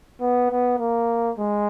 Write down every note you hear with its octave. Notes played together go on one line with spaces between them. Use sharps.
B3
B3
A#3
G#3